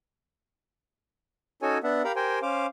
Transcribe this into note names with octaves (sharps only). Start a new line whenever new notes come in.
C#4 D#4 F#4 A4 C#5 G#5
B3 D4 E5 F#5
G4 A#4 F5 A#5 B5
G4 A#4 C5 G5 G#5
C#4 C5 F5 D6